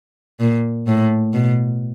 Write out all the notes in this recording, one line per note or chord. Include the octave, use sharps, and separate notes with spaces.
A#2
A2
B2